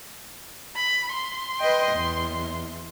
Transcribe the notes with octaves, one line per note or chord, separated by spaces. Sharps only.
B5
C6
B4 D#5 G5
E2